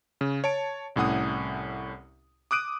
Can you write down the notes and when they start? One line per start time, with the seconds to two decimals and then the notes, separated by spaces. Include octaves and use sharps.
0.21 C#3
0.44 C#5 A5 D7
0.96 C2 A2 C#4 F#5 D#6
2.51 D6 D#6 F#6 D7 D#7